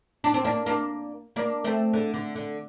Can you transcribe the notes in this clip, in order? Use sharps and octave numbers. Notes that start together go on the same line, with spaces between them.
D4
C4
A#3 D4
A#3 D4
A#3 D4
A3 C4
D3
D3
D3